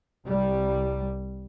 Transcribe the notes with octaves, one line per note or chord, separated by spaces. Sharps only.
C2 G3